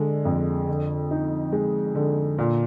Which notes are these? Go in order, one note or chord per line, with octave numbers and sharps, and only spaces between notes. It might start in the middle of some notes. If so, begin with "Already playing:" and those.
Already playing: D3 G#3 D4
F2
D3
D#4
G#3
D3
A#2